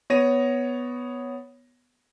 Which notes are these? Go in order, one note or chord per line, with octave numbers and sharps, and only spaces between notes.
B3 C#5 A#6 D#7